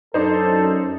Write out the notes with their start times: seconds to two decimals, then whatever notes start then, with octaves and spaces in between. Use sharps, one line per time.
0.14 F#2 D4 D#4 A4 C5